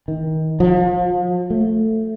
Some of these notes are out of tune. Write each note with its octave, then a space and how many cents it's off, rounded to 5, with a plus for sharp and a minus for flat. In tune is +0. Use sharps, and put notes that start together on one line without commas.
D#3 +25
F3 +35
A3 +10